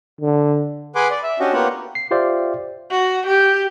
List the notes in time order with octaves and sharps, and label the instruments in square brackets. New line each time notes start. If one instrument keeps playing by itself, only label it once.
[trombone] D3
[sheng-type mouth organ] G#4 B4 F#5 G#5 C6 D6
D5
E5
C#4 D4 F#4 G4 D#5
A#3 B3 F4 G4 C#5 F#5
[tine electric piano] C7
F4 G4 C5 D5 E5 F5
[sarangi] F#4
G4